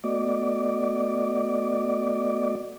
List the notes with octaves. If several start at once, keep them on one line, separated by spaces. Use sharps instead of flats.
A3 B3 F#4 D5 D#5 D6